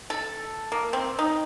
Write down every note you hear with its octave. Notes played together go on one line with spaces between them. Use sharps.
A4
A#3
C4
D#4